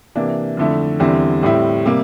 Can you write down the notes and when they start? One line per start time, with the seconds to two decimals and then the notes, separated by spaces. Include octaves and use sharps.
0.15 C3 E3 A#3 D4
0.57 F2 D3 A3 E4
1.00 E2 D3 G3 C4 E4
1.43 A2 G3 C4 E4
1.86 C3 G3 A#3